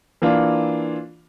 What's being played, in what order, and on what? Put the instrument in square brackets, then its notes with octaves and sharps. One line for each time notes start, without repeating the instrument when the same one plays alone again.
[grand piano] E3 A#3 D4 F4